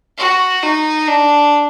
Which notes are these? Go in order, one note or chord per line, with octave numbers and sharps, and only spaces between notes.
F#4
D#4
D4